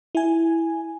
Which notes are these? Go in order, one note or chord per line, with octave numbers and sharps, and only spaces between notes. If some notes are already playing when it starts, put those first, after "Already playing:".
E4 G#5